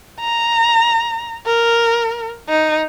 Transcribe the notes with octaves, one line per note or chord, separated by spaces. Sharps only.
A#5
A#4
D#4